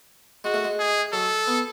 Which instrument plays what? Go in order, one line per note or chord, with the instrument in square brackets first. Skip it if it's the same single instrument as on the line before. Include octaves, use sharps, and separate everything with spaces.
[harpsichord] G#3 [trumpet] F#4
[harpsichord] A3
G#3
[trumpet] G#4
[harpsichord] F#3 [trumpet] A4
[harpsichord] B3